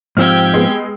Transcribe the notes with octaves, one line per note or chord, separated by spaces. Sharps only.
G#2 F3 C4 G4 G5 E6 F6 G#6
G#3 B3